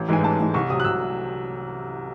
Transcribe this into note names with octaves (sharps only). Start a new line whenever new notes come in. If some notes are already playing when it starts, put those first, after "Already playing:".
Already playing: A1
G#2 E3 G#3 G#5
A1 A5
G#2 E3 G#3
C2 C#6
C3 F#3 D#6
F#6
C2 E6